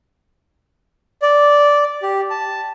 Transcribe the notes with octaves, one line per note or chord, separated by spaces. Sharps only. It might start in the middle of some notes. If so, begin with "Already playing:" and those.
D5
G4
A5